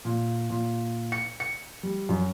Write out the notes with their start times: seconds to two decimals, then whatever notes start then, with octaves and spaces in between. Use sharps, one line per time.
0.05 A#2
0.50 A#2
1.12 C#7
1.40 C#7
1.83 G3
2.09 F#2